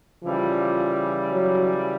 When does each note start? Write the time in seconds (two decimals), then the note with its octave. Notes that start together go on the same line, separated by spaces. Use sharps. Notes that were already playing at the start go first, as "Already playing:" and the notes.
0.23 C#3 E3 F3 G3
1.31 F#3